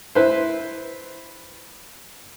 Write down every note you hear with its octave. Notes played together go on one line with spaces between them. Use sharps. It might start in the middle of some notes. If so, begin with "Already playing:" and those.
E4 B4 C5